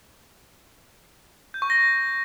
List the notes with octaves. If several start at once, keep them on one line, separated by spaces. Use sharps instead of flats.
G6
C#6
A#6